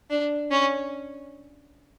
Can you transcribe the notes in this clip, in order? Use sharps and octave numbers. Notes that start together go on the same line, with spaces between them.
D4
C#4